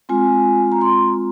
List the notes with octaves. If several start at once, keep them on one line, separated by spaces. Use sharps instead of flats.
G#3 C4 F4 G#5
A#5
C6